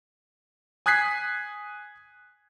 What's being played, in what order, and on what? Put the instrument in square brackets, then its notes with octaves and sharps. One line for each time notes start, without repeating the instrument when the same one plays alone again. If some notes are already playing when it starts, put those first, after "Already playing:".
[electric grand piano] G#5 D#6 F#6 G#6 B6 C7